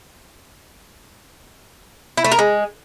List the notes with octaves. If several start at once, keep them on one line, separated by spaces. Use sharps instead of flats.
E4
A3
A#4
G#3